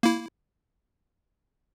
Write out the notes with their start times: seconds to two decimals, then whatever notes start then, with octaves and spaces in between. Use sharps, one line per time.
0.03 A#3 E4